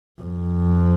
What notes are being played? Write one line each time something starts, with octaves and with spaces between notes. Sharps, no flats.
F2